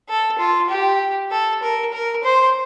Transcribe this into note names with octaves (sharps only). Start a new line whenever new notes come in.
A4
F4
G4
A4
A#4
A#4
C5